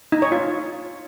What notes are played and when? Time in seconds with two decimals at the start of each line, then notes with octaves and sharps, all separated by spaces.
0.12 D#4
0.22 C#5
0.32 F4